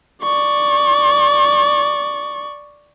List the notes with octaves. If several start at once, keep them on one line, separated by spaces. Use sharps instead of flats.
D5 C#6